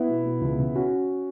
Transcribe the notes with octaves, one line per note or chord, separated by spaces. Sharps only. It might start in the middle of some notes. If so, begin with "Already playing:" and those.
Already playing: B3 E4
B2
B2
C#2
C#3
C#4 F#4